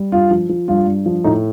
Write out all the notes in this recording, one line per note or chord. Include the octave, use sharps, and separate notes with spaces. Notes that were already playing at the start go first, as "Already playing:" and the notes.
Already playing: G3
G2 F4
F3
F3
G2 F4
G2
F3
A2 D#4